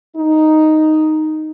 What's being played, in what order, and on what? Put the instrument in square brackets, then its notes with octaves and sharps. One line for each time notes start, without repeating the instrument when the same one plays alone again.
[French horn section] D#4